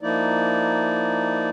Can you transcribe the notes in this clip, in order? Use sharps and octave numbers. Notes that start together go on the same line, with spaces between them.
F3 A#3 D#4 E4 D5